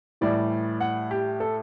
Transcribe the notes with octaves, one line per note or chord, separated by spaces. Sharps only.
A2 E3 G3 D5
F#5
G4
A4